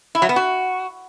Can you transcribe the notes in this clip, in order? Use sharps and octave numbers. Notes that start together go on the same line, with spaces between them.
E4
F#3
B3
F#4